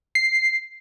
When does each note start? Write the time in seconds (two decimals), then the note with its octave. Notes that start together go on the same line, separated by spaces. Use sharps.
0.15 C7